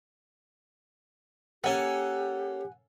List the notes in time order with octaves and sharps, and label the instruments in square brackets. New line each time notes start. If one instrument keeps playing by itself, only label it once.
[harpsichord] A#3 C#4 A4 [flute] G4 [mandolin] F#5 G#5